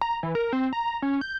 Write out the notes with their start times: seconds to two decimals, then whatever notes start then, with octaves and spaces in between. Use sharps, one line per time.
0.01 A#5
0.23 E3
0.35 A#4
0.53 C4
0.73 A#5
1.02 C#4
1.21 G6